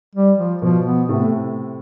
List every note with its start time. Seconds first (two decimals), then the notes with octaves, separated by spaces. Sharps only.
0.15 G3
0.38 F3
0.62 B2 F3
0.86 B3
1.08 A2 C3 A3